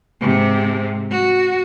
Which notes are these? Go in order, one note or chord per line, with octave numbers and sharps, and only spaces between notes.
G#2 C3
F#4